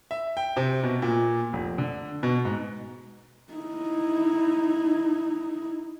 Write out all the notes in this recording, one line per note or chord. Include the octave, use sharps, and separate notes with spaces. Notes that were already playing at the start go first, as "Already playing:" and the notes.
E5
G5
C3
B2
A#2
F1
D3
B2
G#2
D#4 E4